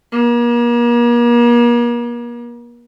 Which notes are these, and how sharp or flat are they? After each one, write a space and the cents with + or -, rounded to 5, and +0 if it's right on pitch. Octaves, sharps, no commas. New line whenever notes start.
A#3 +40